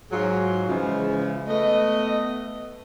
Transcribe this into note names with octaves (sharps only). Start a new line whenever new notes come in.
G#2 F#3 F4 G#4
C#3 E3 F3 G#3
A3 B3 D#5